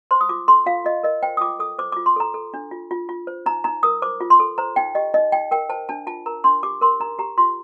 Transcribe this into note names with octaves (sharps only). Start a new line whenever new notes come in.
C5 C6
D#6
F4 D6
A4 C6
F4 F5
F4 D#5
A#4 D#5
C5 G5
D#6
F4 D6
A4 D#6
C5 D6
F4 D6
C6
A4 A#5
A4
D4
F4
F4
F4
C5
D#4 A#5
D#4 A#5
A#4 D#6
C5 D6
F4
C6
A4
C5 A#5
D#4 G5
G4 D#5
D#4 D#5
D#4 G5
A#4 G5
C5 A5
D4 A5
F4 A5
A#4 A#5
D4 C6
G4 D6
A#4 C6
D#4 A#5
G4 A#5
F4 C6